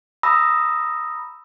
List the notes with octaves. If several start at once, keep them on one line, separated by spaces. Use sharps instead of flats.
A#5 B5 D#6 E6 A#6